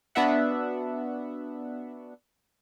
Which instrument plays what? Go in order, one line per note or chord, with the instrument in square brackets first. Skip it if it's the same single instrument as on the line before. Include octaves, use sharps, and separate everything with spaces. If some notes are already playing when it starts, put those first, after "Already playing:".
[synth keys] B3 D4 F#4 E5 F#5